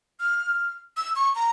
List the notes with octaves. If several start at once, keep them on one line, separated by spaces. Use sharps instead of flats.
F6
E6
C#6
A#5